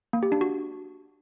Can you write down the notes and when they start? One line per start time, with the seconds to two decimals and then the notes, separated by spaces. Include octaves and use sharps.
0.13 A#3
0.23 G4
0.32 D4
0.41 F#4